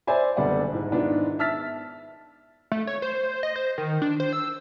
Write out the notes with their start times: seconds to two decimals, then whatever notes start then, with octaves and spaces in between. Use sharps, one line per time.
0.07 C5 D5 E5 G#5 B5
0.37 F#1 D3 G3 B3 D5 F#5
0.72 G#2 E4
0.92 G#2 D#3 B3 D4 E4 F4
1.39 E5 A5 E6 F6 A6 B6
2.72 A3
2.87 C#5
3.02 C5
3.43 D#5
3.56 C5
3.78 D#3
4.02 D4
4.20 C5
4.33 E6